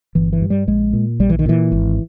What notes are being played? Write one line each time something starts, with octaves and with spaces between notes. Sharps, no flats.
G1 E3
E3
G2
G3
A#1 G#3
A#2
A#1 G3
E3
D#3
A#2 E3
G#1